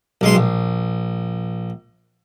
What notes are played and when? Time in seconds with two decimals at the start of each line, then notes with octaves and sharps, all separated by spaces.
0.21 B1 G#3 C6
0.35 A#1